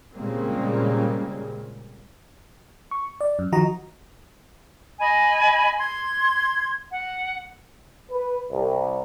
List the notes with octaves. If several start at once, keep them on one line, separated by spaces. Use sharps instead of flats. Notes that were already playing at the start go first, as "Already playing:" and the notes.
A#2 C#3 G3 G#3 A#3 C4
C#6
D5
F#2
D#3 F3 F#4 D#5 A#5
D#5 G#5 B5
C6 G#6
F#5
B4
C2